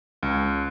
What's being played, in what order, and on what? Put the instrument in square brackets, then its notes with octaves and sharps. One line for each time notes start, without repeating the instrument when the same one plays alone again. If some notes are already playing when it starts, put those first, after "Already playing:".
[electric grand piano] C#2